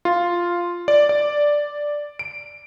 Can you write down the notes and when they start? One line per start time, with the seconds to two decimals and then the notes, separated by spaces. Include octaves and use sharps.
0.05 F4
0.88 D5
1.09 D5
2.19 D7